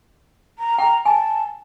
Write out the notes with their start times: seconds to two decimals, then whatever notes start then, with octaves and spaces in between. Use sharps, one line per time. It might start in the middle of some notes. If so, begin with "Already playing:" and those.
0.59 A#5
0.78 G5 A#5
1.05 G#5 A5